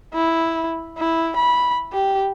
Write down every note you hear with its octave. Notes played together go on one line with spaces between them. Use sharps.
E4
E4
B5
G4